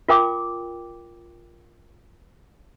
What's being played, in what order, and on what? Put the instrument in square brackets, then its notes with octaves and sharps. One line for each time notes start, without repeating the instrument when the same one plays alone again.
[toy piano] F4 A#4 G5 D6